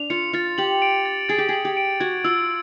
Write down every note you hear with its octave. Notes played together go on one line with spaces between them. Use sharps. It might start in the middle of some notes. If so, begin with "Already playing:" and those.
Already playing: D4 F7
F4 C#7
F4 A6
G4 F#7
D7
A6
G#4 A6
G4
G#4 F#7
G4
D7
F#4 G#6
F4 E6